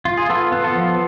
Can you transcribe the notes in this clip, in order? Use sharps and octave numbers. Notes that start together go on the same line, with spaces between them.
F4
G#4
B3 F4 A4
B3
F4 A4
F3